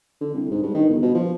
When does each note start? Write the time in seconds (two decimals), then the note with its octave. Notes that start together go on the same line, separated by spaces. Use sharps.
0.21 D3
0.34 C2
0.51 G#2
0.63 G2
0.74 D#3
0.89 G1
1.02 B2
1.14 F3